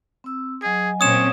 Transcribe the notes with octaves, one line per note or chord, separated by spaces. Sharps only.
C4 E6
F#3 G#4 D#5 G#5
A#2 C4 C#4 C#5 D#6 E7